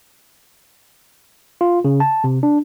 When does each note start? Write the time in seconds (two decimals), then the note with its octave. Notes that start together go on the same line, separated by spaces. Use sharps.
1.61 F4
1.85 C#3
2.00 A5
2.24 C3
2.43 D4